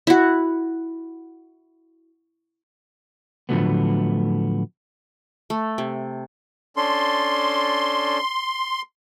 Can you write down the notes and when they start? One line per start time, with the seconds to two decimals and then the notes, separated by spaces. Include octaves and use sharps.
0.07 E4 F#4
3.49 A2 D3 F3 F#3 A3 B3
5.50 A3
5.78 C3
6.77 C#4 D4 A4 C6